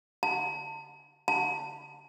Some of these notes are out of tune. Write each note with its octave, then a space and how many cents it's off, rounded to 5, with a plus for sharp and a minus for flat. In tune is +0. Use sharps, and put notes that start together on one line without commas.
A5 +35
A5 +30